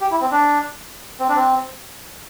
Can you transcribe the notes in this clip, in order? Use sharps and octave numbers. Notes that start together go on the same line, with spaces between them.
G4
E4
C4
D4
C4
D4
C4